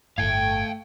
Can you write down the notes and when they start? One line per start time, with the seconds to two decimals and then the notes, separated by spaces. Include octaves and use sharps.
0.18 G1 A2 A3 F5 G5 G#6